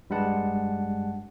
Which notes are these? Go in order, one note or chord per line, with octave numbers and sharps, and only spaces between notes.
G2 G3 G#3 F#5 A5